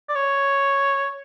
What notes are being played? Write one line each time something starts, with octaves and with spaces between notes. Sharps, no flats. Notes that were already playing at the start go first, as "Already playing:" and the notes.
D5
C#5